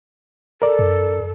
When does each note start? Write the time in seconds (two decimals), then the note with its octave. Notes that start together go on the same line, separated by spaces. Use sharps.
0.62 A4 A#4 D5
0.79 F#2